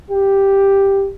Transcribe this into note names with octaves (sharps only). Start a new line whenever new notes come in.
G4